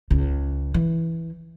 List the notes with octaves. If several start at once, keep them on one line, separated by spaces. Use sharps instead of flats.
C#2 C#3
E3